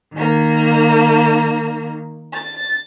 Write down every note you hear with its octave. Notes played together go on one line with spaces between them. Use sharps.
D#3 A#3
A6